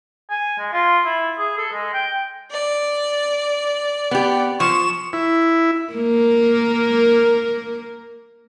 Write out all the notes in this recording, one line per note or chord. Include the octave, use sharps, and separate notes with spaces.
G#5
G#3
F4
E4
G#4
A4
G#3
G5
D5
B3 G4
F3 C#6 E7
E4
A#3 A#4